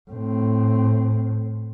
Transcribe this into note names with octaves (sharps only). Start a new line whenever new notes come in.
A2 C4